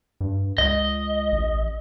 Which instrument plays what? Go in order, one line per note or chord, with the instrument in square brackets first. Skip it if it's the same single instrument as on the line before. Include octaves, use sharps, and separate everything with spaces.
[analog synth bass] G2
[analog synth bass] C#2 [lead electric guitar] D#5
[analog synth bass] A1